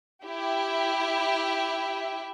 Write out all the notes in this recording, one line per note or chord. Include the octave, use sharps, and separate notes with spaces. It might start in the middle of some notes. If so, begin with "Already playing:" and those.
E4 G4 E5